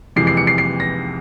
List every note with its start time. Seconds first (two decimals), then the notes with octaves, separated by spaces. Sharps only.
0.16 F2 C3 E3 G#3 C7
0.27 C7
0.37 C#7
0.47 C7
0.58 C7
0.80 A#6